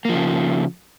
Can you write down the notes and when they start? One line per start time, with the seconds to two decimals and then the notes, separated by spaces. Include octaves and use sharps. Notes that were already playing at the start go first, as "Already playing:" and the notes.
0.05 A#3
0.09 F3
0.13 C#3